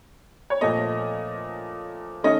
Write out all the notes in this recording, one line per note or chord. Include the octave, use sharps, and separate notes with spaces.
C#5
A#2 F3 A3 D#5
D#3 A3 C#4 D#5